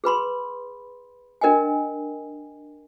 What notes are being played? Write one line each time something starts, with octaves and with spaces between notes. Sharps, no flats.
G#4 B4 B5 C6
D4 A#4 D#5 G5 G#5